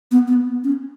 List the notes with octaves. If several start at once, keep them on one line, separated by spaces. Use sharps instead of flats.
B3
B3
C#4